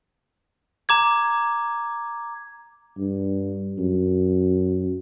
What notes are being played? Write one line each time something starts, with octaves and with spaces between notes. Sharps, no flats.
A#5 D6 G#6
G2
F#2